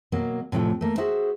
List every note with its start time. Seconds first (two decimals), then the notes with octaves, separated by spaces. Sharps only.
0.12 B2 F#3 A#3
0.52 A2 C3 F3 A3 C4
0.81 A3 A#3
0.98 F#4 G#4 C5 E5